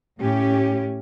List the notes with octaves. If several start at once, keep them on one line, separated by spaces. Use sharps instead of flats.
A2 C#4 G4